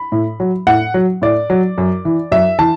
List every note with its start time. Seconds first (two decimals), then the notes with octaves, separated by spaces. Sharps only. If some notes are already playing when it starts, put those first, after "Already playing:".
Already playing: B5
0.12 A2
0.40 F#3
0.67 A2 F#5
0.94 F#3
1.22 A2 D5
1.50 F#3
1.78 F#2
2.05 E3
2.32 F#2 E5
2.59 E3 A5